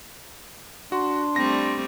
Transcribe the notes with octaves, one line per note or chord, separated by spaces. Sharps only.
D4 F#4 C6
G3 A3 C4 A#6